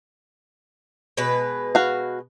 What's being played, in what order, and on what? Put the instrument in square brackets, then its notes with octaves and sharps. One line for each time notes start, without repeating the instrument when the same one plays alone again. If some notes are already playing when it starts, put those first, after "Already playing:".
[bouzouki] B2 G#3 B4
[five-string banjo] F#4 F5